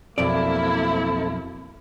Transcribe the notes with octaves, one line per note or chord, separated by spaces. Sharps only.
B1 F2 A#3 C4 E4 A4 D5